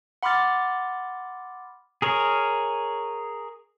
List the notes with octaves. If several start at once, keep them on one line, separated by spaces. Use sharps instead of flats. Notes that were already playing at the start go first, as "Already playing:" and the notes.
F#5 B5 C6 D6 F6 A6
G#4 A#4 C#5